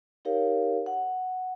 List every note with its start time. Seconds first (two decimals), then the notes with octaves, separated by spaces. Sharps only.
0.25 D#4 G4 A#4 C#5 F5
0.86 F#5